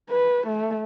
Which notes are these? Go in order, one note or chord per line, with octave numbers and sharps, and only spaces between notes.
B4
A3